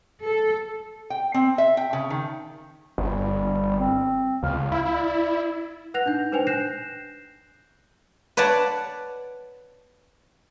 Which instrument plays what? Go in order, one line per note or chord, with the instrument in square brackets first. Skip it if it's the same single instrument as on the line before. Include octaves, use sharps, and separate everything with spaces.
[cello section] A4
[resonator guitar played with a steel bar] G5
C4
E5
G5
C#3
D#3
[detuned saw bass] G1 [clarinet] G3
[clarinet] C4
[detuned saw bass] C#2 [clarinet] F5
[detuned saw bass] E4
[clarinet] D5
[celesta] B4 F#5 F#6 A#6 F7
D4 D#4 G6
D4 B4 C5 G5 G#5 F7
F#6 G6 A#6 C7 E7
[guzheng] B4 C#5 D5 F#5 A5